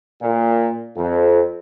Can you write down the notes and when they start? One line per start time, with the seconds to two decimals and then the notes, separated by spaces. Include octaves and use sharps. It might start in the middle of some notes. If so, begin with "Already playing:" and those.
0.22 A#2
0.96 F2